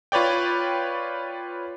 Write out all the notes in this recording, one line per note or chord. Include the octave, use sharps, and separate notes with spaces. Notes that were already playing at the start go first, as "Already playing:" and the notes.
F4 B4 C#5 D5 G5